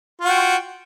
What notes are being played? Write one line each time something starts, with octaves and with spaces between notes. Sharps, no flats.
F4 F#4 G5